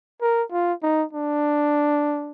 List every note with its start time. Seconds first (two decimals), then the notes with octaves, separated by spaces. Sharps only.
0.22 A#4
0.52 F4
0.83 D#4
1.13 D4